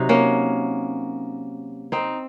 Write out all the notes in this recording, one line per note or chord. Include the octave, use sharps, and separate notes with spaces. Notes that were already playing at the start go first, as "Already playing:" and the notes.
Already playing: C3 F#3 D#4 F#4
A#3 C#4
C4 D#4